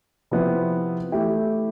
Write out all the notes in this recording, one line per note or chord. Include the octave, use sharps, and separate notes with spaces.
C3 F3 B3 E4
E3 A3 E4 G4